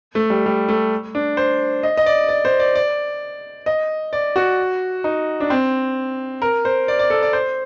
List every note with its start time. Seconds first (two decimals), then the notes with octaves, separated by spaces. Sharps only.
0.15 A3
0.30 G3
0.46 G3
0.68 A3
1.15 D4
1.37 C5
1.83 D#5
1.97 D#5
2.06 D5
2.29 D5
2.45 C5
2.59 D5
2.75 D5
3.66 D#5
4.13 D5
4.36 F#4
5.04 D#4
5.40 D4
5.50 C4
6.42 A#4
6.65 C5
6.88 D5
6.99 D5
7.10 A4
7.22 D5
7.33 C5